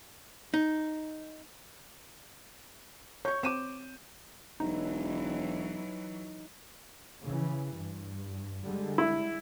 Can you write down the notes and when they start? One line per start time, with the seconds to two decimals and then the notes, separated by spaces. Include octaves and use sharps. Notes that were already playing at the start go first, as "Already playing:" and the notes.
0.54 D#4
3.25 C#5 C#6 G6
3.43 C4 D6 D#7 E7
4.60 E1 E3 F#3 D#4
7.23 C#3 E3
7.74 G2
8.65 D3 G3 G#3
8.98 E4